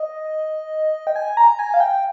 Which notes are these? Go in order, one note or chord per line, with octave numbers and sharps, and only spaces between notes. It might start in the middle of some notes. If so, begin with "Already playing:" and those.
Already playing: D#5
G5
G#5
A#5
G#5
F5
G5